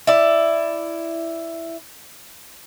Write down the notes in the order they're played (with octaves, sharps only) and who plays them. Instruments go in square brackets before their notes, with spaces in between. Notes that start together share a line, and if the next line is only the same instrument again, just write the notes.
[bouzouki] E4 D5